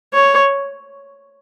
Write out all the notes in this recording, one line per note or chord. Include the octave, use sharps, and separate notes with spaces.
C#5